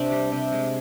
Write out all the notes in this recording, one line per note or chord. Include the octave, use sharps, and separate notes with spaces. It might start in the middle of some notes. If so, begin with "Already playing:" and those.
Already playing: C3 C4 D4
G3
C3
G#3